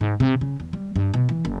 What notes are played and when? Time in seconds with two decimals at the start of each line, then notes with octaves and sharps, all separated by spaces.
0.01 G#2
0.20 C3
0.41 C#3
0.60 E2
0.73 G3
0.96 G2
1.14 B2
1.29 E3
1.45 F#1